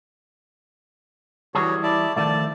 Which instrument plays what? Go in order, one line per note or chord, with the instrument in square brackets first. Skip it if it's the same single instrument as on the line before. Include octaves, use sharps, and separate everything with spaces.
[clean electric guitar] E3 G3 G#4 [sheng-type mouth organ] F#4 C#5
[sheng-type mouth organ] E4 D5 A5
[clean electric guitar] D#3 F3 A3 [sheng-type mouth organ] D5 A5